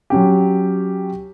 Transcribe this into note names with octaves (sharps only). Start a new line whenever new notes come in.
F#3 C#4 G4